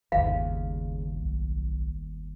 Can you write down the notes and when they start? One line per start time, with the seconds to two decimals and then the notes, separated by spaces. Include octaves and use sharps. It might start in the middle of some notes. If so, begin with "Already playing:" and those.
0.12 G1 D#2 C#3 F5
1.14 B1